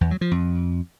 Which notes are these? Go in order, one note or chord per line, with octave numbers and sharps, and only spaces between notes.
E2
F#3
F3
F2